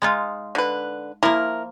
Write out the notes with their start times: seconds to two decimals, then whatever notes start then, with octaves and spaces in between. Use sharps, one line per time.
0.02 G#3 D#4 F4
0.55 D3 B4
1.23 F3 A#3 E4 A#4